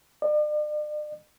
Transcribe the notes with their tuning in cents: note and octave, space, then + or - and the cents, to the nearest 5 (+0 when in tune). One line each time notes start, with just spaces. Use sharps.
D5 +40